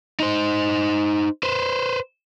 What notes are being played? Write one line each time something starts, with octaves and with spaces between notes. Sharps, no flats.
D#4 C5
B4 C5